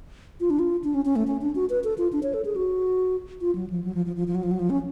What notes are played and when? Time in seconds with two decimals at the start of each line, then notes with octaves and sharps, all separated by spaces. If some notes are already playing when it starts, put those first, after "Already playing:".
0.41 F4
0.50 D4
0.59 F4
0.84 D4
0.94 C#4
1.05 C#4
1.16 A3
1.27 C#4
1.41 D4
1.55 F#4
1.70 B4
1.84 A4
1.98 F4
2.13 D4
2.23 C#5
2.34 A4
2.45 G#4
2.56 F#4
3.41 F4
3.55 F#3
3.70 F3
3.84 F#3
3.95 F3
4.06 F3
4.16 F3
4.27 F3
4.35 F#3
4.43 F3
4.51 F#3
4.59 F3
4.70 C#4